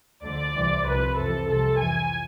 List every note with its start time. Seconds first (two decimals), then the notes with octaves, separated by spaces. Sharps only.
0.23 D2 D3 F3 D5
0.54 C2 C3 E3
0.85 C2 C3 F3 B4
1.16 F2 C3 E3 A4
1.48 C2 C3 F3 A4
1.78 F2 E3 G#5